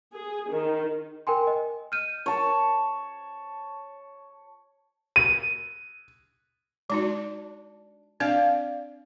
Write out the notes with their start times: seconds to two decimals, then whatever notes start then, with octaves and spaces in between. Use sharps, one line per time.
0.14 G#4
0.51 D#3
1.27 A#4 G5 G#5 C6
1.47 D#5
1.92 F6 G6 D#7
2.26 C#5 A5
5.16 D#7
6.90 G#3 D4 D#4 F#4
8.20 C4 D4 D5 F5